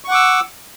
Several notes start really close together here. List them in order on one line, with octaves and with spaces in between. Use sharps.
C#6 F#5 D6 E6